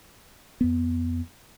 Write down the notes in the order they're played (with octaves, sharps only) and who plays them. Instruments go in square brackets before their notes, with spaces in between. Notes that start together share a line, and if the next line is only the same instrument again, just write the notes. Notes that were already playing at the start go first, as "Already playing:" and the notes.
[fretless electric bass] F2 B3